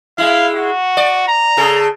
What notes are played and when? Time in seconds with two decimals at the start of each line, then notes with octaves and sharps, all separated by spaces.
0.18 G#3 E4 F5
0.55 F#4
0.97 D5
1.28 A#5
1.57 C#3 G#4 A4